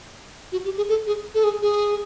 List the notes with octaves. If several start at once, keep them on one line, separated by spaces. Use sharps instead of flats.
F#4
G4
G#4
A4
G#4
A4
G#4
G#4